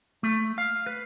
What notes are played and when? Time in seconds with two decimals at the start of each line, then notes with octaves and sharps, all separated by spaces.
0.23 A3
0.58 F5
0.86 B4